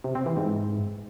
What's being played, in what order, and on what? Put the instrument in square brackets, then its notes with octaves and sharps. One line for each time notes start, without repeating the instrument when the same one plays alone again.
[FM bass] C3
C4
E3
G#2